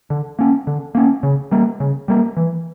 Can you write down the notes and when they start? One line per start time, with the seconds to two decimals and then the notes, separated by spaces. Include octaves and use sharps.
0.10 D3
0.39 A#3 C#4
0.67 D3
0.95 A#3 C#4
1.23 C#3
1.51 G3 A#3
1.80 C#3
2.08 G3 A#3
2.37 E3